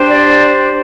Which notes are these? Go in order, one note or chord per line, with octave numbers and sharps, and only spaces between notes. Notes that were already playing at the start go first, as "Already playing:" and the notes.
Already playing: D4 G4 C5
D5